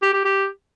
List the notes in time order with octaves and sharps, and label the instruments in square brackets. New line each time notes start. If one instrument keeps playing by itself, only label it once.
[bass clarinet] G4
G4
G4